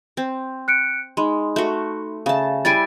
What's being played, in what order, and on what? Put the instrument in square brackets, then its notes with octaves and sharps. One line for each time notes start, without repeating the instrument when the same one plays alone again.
[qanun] C4
[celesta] F#6 C#7 D7
[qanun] G#3 [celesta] D#4 B5 C6
[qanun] A3 F#4
[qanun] C#3 A5 [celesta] E5 F5
[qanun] G3 E4 G#5 [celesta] A6 D7